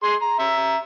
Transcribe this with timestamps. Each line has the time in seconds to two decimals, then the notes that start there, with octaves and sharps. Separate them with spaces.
0.03 G#4 C6
0.22 A#5
0.39 E5 A#5